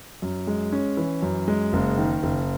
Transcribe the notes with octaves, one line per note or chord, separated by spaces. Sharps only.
F#2
G#3
C#4
E3
F#2
G#3
F#1
D#3
F#1